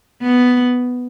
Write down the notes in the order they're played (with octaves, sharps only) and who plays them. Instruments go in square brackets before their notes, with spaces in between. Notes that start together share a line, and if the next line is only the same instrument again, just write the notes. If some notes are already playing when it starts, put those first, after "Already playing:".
[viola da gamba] B3